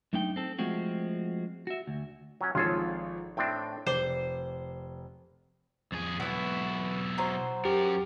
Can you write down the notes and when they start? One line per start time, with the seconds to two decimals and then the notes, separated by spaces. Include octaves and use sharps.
0.13 F#2 A3 D4 D#4 G5
0.36 C4 A4
0.59 F3 G#3 A3 C4 F#4
1.67 F#4 E5
1.87 D2
2.41 F#3 C#4
2.55 G#1 F3 F4 G#4 A4 C#5
3.37 A2 C4 D4 G5
3.86 F1 C5 D5
5.92 F2 G#4
6.20 B1 B3 E4 F#4
7.18 F#3 C5
7.65 F#2 G4 A#4